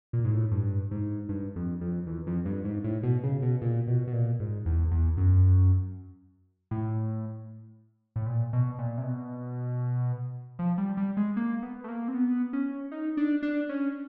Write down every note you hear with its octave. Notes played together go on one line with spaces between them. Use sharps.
A#2
G#2
A2
G2
G#2
G2
F2
F2
E2
F2
G2
G#2
A2
B2
C#3
B2
A#2
B2
B2
A#2
G#2
E2
E2
F#2
A2
A2
A#2
B2
A#2
C3
B2
F3
G3
G3
G#3
A#3
B3
A3
A#3
C4
B3
C#4
D#4
D4
D4
C#4